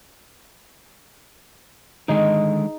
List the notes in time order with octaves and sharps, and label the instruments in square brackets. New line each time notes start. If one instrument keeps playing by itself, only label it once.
[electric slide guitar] D3 D#3 G#3 [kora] D#4 G#4